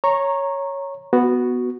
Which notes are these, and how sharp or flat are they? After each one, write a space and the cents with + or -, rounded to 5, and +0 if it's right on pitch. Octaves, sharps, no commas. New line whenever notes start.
C#5 +0 A#5 +0 C#6 -20
B3 +0 F#4 +0